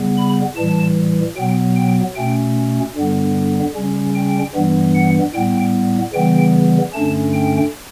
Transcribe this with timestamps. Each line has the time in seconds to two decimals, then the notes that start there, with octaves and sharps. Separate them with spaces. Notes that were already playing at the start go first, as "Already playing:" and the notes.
Already playing: C#3 G3 B3
0.17 B5
0.56 A2 E3 G3 A5
1.36 B2 F#3 B3 G5
1.76 G5
2.16 B2 A3 C#4 G5
2.95 G2 D3 G3 B3
3.75 C#3 G3 C#4
4.15 G5
4.54 G2 E3 G3 B3
4.94 F#5
5.34 A2 G3 B3 G5
6.14 C#3 E3 G3 B3 G5
6.93 G2 D3 A3 C#4 A5
7.34 G5